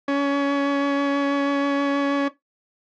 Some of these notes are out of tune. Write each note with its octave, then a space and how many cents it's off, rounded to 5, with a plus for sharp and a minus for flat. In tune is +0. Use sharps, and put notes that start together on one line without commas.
C#4 +25